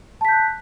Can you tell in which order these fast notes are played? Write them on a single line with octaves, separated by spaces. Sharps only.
A5 B6 G6 F#6